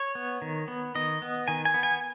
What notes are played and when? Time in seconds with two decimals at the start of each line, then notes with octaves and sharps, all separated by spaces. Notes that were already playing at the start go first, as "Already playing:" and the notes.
Already playing: C#5
0.15 B3
0.42 D#3
0.68 B3
0.95 D#3 D#5
1.22 B3
1.48 D#3 G#5
1.65 G#5
1.74 B3
1.83 G#5